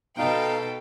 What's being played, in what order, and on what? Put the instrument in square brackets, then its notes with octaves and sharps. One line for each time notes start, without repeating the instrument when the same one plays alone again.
[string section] B2 A4 G5 [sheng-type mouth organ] D#4 F5